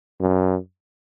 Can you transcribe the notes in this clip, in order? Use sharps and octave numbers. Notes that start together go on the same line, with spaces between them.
F#2